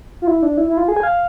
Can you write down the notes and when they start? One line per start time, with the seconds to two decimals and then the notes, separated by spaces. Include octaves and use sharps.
0.22 F4
0.27 E4
0.43 D4
0.57 E4
0.68 E4
0.77 F4
0.88 G#4
0.97 G#5
1.03 F5